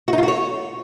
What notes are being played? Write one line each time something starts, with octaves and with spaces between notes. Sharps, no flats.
F#4
D#4
F4
F#4
C#5